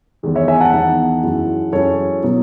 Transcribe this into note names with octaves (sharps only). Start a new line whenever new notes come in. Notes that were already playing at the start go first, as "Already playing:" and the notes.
E2 D#3 G#3 D#4
C#5 E5
E5 G#5
F#5 A5
E2 D#3 G#3 D#4
F#2 E3 G#3 C#4 E4
F#2 E3 G#3 C#4 E4 A4 C#5
B2 F#3 B3 E4